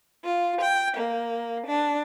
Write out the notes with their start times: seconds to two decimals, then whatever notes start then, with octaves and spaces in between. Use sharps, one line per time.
0.24 F4
0.60 G5
0.96 A#3
1.65 D4